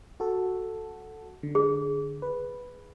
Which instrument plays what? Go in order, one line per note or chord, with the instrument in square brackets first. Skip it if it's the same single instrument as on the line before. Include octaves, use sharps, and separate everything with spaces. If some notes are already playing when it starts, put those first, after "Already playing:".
[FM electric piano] F#4 A4
D3
[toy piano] G#4
[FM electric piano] B4